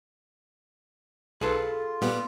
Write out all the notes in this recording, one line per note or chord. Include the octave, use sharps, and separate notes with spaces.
B1 F4 G#4 A4 B4
A#2 G3 B3